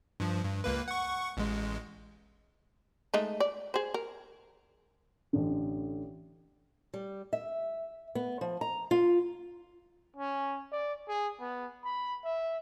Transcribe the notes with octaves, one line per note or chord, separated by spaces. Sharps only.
G2 F3
G2
C#2 A#3 B4
F#5 C#6
A1 G#3
G#3 A3 D#4
D5
G#4 C5
A#4
A1 D3
G3
E5
B3
F3
A#5
F4
C#4
D5
G#4
B3
B5
E5